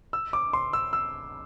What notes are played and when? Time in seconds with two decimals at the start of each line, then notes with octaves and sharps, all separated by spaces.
0.13 E6
0.33 D6
0.53 C6
0.73 E6
0.93 E6